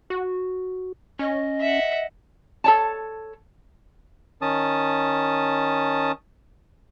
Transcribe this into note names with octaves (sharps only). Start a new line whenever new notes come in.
F#4
C#4 D#5
E5 F#5
A4 C#5 A5
D#3 C#4 A5 D#6